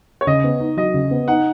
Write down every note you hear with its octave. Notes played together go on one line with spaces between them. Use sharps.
C#5
C#3 D#5
B3
D#4
F#3 D#5
C#3
B3
D#4 F#5